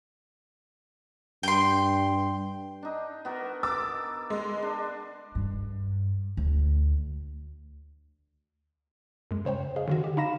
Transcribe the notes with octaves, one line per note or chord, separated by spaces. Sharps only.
G2 G5 C6
D4 D#4
B3 F#4 A#4
D6 E6 A6
G#3
D4
G2
D2
F#2 G#3
C#3 C5 C#5 G5
G#4 D#5 F5
D3 D#3 F#4
G4
D#4 F5 B5 A#6 E7